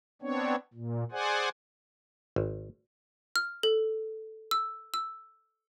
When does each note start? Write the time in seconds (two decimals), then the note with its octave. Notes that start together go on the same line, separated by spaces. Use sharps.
0.22 B3 C4 D4 C#5
0.74 A#2
1.12 G#4 C5 D5 F#5 G#5
2.36 G#1
3.36 F6
3.63 A4
4.51 E6
4.94 E6